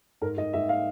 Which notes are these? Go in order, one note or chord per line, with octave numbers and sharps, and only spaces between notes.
G#2 A#4
G#2 D#5
G#2 E5
F5